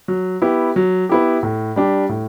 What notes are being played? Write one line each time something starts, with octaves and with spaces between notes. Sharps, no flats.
F#3
B3 E4 G4
F#3
B3 E4 G4
A2
G3 D4 G4
A2